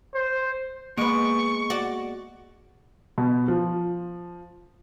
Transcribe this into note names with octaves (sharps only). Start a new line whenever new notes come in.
C5
G#3 A#3 B3 C#6 D7
F#4 D5
B2
F3